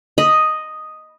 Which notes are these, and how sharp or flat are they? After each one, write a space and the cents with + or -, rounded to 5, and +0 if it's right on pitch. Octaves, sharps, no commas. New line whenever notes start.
D#5 +0 B5 -10